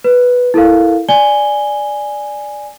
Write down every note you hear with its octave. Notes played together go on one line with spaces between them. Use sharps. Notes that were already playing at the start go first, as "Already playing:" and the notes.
B4
E4 A4 A#4 F5
D5 G#5 G7